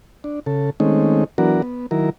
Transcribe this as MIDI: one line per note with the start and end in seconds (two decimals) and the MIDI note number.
0.24 0.40 62
0.46 0.70 49
0.46 0.70 69
0.80 1.24 51
0.80 1.24 56
0.80 1.24 57
0.80 1.24 60
0.80 1.24 61
0.80 1.24 63
1.38 1.62 52
1.38 1.62 54
1.38 1.62 59
1.38 1.62 62
1.38 1.62 66
1.38 1.62 70
1.62 1.86 59
1.91 2.10 51
1.91 2.10 54
1.91 2.10 64
1.91 2.10 70